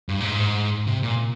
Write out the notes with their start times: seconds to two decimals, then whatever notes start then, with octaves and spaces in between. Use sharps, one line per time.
0.09 G2
0.21 A#2
0.25 G#2
0.87 C3
1.03 A#2